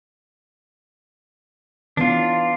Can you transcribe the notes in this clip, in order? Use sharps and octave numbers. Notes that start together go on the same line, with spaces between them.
E3 B3 C#4 D4 F4